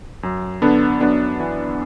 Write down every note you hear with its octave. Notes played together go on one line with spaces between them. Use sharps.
F#2
D3 B3 D4
F#2 B3 D4
E3